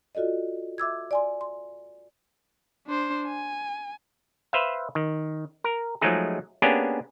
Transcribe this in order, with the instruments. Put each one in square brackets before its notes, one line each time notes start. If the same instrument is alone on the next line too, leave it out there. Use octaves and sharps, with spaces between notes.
[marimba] F4 F#4 A4 D5 D#5
E5 D6 E6 G#6
D5 G#5 C6
C6
[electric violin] D4 C5
G#5
[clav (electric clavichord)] B4 C5 E5 F5
D#3
A#4
F3 F#3 G#3 A3 D#4 G#4
A#3 B3 C#4 D4 G4 G#4